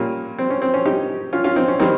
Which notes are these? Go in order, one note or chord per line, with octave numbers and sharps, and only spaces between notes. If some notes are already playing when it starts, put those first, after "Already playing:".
Already playing: A#2 G3 A#3 C#4
C4
C#4
C4
C#4
D#4 G4
C#4 F4
C#4 F4
C4 D#4
C#4
D#3 G3 A#3 C4 D#4